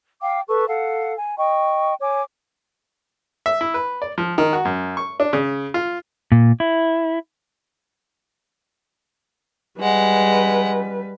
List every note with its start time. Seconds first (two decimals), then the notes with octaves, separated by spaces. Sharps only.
0.22 F5 G5 D6
0.48 A4 B4 C#6
0.68 A4 F5 F#5
1.17 G#5
1.37 D#5 G5 C#6
2.01 C#5 G#5 D6
3.46 E5
3.61 E4
3.74 B4
4.02 D5
4.18 F3
4.38 D#3
4.53 F#4
4.65 F#2
4.97 C#6
5.20 D4
5.33 C#3
5.74 F4
6.32 A#2
6.60 E4
9.80 G3 G#3 B4 F#5